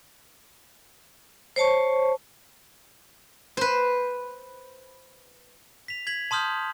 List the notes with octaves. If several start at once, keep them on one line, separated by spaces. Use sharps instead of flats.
C5 C#5 A5 C#6
B4 C5
B6 F7
G#6 B6 F#7
A5 C6 D#6 F6 G6